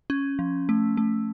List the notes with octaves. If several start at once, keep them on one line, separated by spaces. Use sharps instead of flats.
C#4
F3
A3
A3